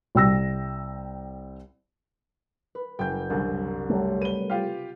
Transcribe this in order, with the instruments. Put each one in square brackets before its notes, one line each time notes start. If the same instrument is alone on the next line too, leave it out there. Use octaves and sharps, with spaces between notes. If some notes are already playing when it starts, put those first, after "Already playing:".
[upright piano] C2 G5 E6 A#6
[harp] B4
[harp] F#1 [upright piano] G5 G6
[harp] C2 [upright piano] F#2 D3 D4
[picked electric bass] F#3 G3 A3
[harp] B4 [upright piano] D#7 G7
[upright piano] F4 G4 F5